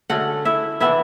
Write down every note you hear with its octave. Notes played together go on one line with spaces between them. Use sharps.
D3 A3 C#4 F#4 F#5
E4 E5
E3 B3 D4 E4 E5